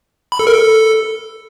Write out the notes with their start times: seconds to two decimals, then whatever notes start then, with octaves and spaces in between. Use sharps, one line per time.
0.32 B5
0.39 A4
0.47 A#4
0.54 A4